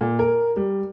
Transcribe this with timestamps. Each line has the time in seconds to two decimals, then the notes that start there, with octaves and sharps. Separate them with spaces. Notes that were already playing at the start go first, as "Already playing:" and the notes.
0.01 A#2
0.19 A#4
0.56 G3